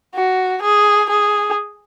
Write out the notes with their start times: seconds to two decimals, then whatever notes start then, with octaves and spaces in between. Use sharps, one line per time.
0.15 F#4
0.62 G#4
1.10 G#4